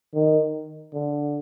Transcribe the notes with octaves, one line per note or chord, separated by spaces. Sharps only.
D#3
D3